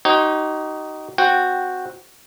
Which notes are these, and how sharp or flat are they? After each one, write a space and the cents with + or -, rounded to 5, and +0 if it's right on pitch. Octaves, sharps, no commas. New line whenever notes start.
D#4 +0 G4 -45 C#5 -45
C4 -10 F#4 -10 G5 +0